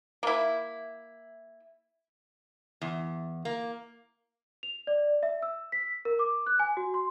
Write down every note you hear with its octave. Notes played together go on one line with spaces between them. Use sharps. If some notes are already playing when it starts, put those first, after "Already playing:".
A#3 E4
E2
A#3
F7
D5
E5
E6
B6
A#4
D6
F#6
G#5
F#4
C6